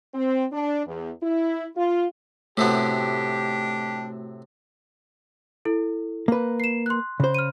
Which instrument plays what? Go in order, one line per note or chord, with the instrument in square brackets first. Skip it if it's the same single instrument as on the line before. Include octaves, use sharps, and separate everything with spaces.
[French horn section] C4
D4
E2
E4
F4
[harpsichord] A2 C3 B3 [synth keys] A3 F#4 [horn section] D4 G4
[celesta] E4 A4
[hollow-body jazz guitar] A#3 B4
[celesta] C7 E7
C6 F#6
[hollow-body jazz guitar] C#3 C5
[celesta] F6 D#7